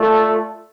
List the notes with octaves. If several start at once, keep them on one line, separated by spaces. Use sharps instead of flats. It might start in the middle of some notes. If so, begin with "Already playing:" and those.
Already playing: A3 F4 A4 D5